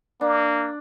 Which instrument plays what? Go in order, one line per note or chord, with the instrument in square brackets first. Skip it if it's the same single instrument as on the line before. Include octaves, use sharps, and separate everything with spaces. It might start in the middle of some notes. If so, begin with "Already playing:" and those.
[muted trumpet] A#3 [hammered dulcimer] D4